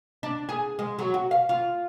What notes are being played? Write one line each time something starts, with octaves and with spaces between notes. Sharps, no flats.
D4
G#4
G#3
F#3
F#4
F5
F4